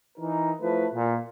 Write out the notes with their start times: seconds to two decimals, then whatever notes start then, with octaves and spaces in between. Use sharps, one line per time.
0.19 E3 D#4 A#4
0.61 F3 A3 E4 B4
0.94 A#2